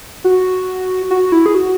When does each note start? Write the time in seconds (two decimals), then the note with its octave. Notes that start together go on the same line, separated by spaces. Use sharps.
0.24 F#4
1.11 F#4
1.32 E4
1.46 G#4
1.55 F#4